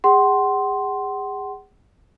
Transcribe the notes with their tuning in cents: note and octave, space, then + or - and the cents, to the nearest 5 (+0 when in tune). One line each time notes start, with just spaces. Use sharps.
G#4 -30 F#5 +35 C6 +0